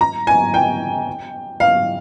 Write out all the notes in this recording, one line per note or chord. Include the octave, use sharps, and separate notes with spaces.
A#5
G#5
G5
F5